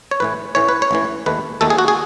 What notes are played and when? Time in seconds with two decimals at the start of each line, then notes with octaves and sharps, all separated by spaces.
0.11 C#5
0.20 A1 A2 E3 B4
0.55 A1 A2 E3 C#5
0.69 B4
0.82 C#5
0.91 A1 A2 E3
1.26 D#2 D#3 A3 B4
1.61 D#2 D#3 A3 A4
1.70 G#4
1.78 F#4
1.88 G#4